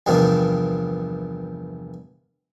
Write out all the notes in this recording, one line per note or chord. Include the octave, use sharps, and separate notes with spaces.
E2 G2 C3 D#3 F3